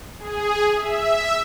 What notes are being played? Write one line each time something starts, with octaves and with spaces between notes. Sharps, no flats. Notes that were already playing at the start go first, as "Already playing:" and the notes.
G#4
E5